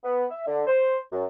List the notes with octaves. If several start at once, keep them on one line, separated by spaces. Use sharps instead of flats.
B3
E5
D3
C5
F#2